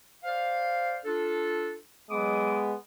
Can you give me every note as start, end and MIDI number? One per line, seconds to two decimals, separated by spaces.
0.24 0.98 72
0.24 0.98 74
0.24 0.98 77
1.05 1.73 62
1.05 1.73 65
1.05 1.73 69
2.10 2.58 54
2.10 2.74 56
2.10 2.74 59
2.10 2.58 86
2.10 2.58 87